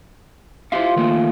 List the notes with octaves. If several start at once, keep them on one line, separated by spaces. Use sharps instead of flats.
F4 G4 C5 E5 F5
D#3 A3 A#3